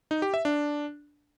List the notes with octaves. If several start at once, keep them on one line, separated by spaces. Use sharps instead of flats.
D#4
G4
E5
D4